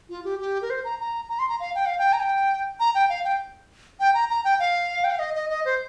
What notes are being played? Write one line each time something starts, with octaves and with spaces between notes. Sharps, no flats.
F4
G4
G4
A#4
C5
A#5
A#5
A#5
C6
A#5
F5
G5
F5
G5
A#5
G5
A#5
G5
F5
G5
G5
A#5
A#5
G5
F5
G5
F5
D#5
D#5
D#5
C5